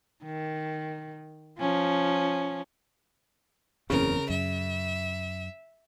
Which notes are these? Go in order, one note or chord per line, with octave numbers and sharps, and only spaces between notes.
D#3
F3 C#4
F#1 E2 C#3 C4 A#4
F#2 E5